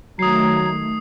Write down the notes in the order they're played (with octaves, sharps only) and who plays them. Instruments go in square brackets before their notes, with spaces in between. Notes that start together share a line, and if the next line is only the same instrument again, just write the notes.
[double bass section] D#3 A3 [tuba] F#3 [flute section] A#5 G#6 [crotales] D#6 C7